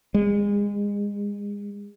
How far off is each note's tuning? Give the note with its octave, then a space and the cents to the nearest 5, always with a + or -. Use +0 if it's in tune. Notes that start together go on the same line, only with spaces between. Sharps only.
G#3 -30